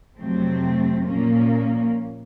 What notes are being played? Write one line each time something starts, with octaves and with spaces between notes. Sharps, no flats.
F2 C3 F#3 A3 C4
A#2 F3 A#3 C#4